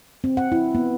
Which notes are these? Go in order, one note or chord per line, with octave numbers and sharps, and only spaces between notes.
C4
F#5
E4
B3